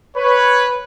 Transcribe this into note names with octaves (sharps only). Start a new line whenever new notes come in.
B4 C#5